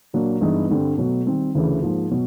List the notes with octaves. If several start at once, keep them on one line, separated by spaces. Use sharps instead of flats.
A#2 F#3 A#3 D4
G2 E3 G#3 B3 D#4
G2 D3 G3 C4
B2 F#3 A3
D#3 G3 C4
D2 C#3 E3
G#2 F3 A#3
B2 F#3